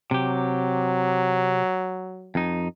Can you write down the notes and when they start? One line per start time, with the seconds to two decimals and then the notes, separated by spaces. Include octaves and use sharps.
0.11 C3 F#3 G4
2.35 F2 D#4